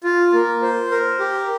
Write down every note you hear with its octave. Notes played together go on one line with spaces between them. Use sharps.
F4
A#3
C5
A#4
G4